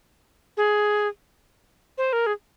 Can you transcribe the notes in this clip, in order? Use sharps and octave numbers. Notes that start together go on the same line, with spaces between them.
G#4
C5
A#4
G#4